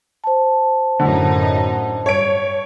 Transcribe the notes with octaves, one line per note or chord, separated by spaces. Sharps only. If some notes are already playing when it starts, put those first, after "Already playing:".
C5 A5
F#2 A2 D3 D#4
G2 C#5 D7